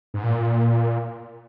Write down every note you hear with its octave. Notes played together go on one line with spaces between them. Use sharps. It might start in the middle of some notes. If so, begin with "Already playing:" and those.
G#2
A#2